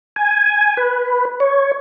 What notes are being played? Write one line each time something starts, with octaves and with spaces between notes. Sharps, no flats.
G#5
B4
C#5